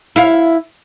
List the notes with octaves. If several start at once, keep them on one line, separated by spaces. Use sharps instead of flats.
E4 F5